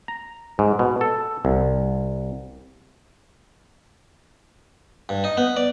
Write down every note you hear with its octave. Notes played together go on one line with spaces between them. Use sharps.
A#5
G#2
B2
A4
C2
G2
D#4
B3
D5